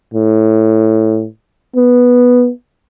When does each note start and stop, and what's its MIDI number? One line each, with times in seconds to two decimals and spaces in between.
0.14 1.26 45
1.76 2.51 59